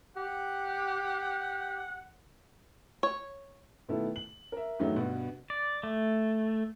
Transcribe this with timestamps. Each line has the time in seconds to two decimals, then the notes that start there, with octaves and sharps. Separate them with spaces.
0.16 G4 F#5
3.03 C#5
3.88 B2 D#3 A3 B3 E4 A4
4.16 F#7
4.52 A#4 E5
4.79 E2 G2 D#3 F#3 A3 D#4
4.96 G2 B2 F#5
5.50 D5
5.83 A3